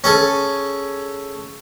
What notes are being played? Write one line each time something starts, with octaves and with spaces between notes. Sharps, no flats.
C#4 G#4 A4